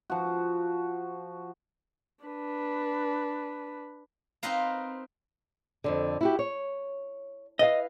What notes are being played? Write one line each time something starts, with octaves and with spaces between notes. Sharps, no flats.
F3 F#4
D4 B4
C4 D#4 A#4 B4 F5 A#5
F2 G#2 D3
E4 F#4 G4
C#5
E4 B4 D#5 F5